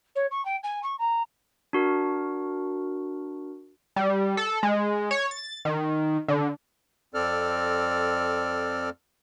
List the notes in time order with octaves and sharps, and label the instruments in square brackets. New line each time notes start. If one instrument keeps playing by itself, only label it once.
[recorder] C#5
C#6
G5
G#5
C#6
A#5
[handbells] D4 F#4 A#4
[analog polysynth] G3
A4
G#3
C#5
A6
D#3
D3
[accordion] F2 C4 A4 D5 F6